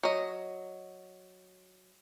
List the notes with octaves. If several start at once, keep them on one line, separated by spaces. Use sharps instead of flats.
F#3 D#5